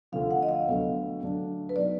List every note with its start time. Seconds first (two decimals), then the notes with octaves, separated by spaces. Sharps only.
0.12 D2 D3 F3 F5
0.31 F#5
0.43 D#5
0.49 F5
0.67 D2 D3 F#3 B3
1.22 D2 D3 F#3 D4
1.69 B4
1.76 B2 F#3 B3 D#4 D5